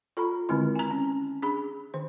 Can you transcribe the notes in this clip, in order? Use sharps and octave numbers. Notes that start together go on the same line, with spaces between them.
F4 A4 A#5 B5
D3 D#3 G#3 C4 E4
G#5 A#5
C#4
D4 G#4 B5
D#3 C5